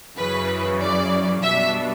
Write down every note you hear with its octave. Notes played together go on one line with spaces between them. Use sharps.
F#2 C#3 E3 B4
D5
B2 G3 B3 D4 E5